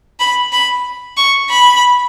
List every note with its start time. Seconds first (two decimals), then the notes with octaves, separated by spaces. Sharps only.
0.20 B5
0.53 B5
1.17 C#6
1.50 B5